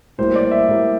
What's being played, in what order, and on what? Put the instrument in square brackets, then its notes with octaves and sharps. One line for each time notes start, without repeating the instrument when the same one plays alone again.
[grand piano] A2 G3 A#3 C5
D5
E5
A2 G3 A#3